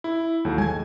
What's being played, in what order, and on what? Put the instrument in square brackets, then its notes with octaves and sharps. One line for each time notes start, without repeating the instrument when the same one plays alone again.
[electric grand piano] E4
D#2 F#3 A4
[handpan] G#3 [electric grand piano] G#5 G#6